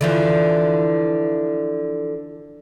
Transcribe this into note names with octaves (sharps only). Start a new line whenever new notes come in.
D3 E3 F3